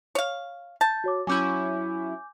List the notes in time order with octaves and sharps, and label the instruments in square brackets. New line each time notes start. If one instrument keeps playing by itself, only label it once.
[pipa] C#5 F5
[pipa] A5 [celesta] G6
[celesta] F#4 C#5 D6
[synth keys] F#3 C#4 E4 [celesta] G#5 D6 G6